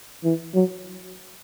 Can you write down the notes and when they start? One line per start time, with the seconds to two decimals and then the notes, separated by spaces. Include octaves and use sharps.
0.24 E3
0.54 F#3